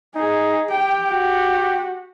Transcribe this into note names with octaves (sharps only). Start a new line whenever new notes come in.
D#4 G#4
G4 G5
F#4